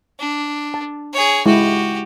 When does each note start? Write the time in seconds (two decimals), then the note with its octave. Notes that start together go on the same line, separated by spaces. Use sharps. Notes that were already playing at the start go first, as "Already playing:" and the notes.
0.19 D4
0.74 A5
1.13 G#4 C#5
1.46 G#3 E4 F#4 G4